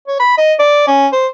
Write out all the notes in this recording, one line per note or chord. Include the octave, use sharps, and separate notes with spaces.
C#5
B5
D#5
D5
C#4
C5